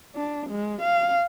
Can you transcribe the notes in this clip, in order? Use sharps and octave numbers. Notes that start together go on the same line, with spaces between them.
D4
G#3
F5